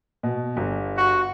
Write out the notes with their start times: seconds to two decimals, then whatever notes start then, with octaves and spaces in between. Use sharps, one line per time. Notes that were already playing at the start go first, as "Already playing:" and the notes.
0.23 B2
0.57 G1
0.97 F#4